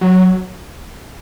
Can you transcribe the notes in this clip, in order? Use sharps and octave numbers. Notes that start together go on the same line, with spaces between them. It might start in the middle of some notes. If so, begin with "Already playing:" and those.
F#3